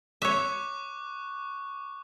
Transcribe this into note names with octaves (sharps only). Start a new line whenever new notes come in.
C#5 E5 C#6 D6 F#6